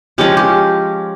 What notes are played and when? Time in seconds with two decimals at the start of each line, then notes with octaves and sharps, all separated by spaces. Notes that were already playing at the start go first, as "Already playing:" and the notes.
0.18 F3 G#3 C#4 G4
0.37 G4